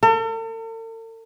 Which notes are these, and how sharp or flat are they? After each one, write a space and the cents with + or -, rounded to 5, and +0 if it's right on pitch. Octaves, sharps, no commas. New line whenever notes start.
A4 +45